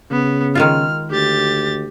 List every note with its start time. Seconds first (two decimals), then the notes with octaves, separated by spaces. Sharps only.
0.11 C#3 B3
0.55 D#3 G#3 F4 F6
1.10 D2 G4 A6